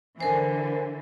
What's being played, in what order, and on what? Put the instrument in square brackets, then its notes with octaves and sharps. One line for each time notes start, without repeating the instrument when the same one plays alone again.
[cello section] D3 E3 [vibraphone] A#4 C5 [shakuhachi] G#5